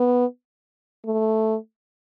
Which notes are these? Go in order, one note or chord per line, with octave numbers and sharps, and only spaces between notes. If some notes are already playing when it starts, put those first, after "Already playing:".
Already playing: B3
A3